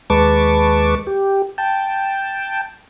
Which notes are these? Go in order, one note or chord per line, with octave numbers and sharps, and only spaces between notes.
D#2 G#3 B4 A5 C#6 D6
G4
G5 A5